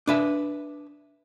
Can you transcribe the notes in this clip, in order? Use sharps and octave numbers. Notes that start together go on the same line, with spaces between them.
D4 B4 E5